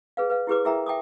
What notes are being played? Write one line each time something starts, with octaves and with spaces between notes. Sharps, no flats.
G#4 B4 F5
B4 F5
E4 G4 G#4 B4 D6
E4 G#4 A#4 E5 G5 A#5
E5 G5 A5 D6 D#6